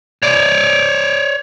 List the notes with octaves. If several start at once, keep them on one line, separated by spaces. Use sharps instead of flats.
C#5 D5